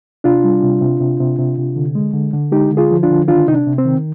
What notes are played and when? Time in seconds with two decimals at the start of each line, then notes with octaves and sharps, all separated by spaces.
0.24 C3 D4 F4
0.44 G3
0.63 C3
0.81 C3
1.00 C3
1.20 C3
1.39 C3
1.58 C3
1.76 D3
1.95 G#3
2.14 D3
2.33 D3
2.52 G#3 D#4 G4
2.71 D3
2.77 F4 G#4
2.91 F3
3.03 D4 F4
3.10 D3
3.28 D#3 D4 F4
3.48 C3 D#4
3.54 D4
3.66 C3
3.78 C4
3.85 D#3